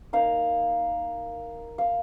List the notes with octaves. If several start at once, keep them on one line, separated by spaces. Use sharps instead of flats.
A#3 D#4 F5
F5